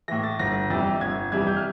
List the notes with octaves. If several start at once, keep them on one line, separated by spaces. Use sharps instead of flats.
A2 E3 A#6
A6
G1 A#6
F2 C3 E3 G3 A6
G1 G#6
F2 C3 E3 G3 G#6
G6
F6